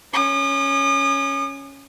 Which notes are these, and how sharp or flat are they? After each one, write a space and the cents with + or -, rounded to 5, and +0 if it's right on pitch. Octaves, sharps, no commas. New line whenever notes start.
C#4 +0 D#6 -40